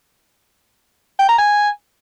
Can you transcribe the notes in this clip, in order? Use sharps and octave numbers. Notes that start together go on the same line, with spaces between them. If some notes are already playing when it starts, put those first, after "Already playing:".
G5
A#5
G#5